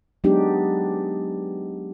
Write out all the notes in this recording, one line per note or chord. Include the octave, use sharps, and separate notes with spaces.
F#3 G#3 B3 D4 D#4 G4